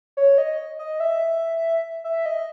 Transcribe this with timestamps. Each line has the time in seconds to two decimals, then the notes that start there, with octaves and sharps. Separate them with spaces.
0.17 C#5
0.38 D#5
0.79 D#5
1.00 E5
2.04 E5
2.26 D#5